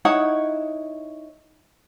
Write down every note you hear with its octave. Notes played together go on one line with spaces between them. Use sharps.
D#4 E4 C#5 F#5